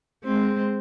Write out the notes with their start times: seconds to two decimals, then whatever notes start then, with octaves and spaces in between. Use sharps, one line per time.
0.24 G#3 C4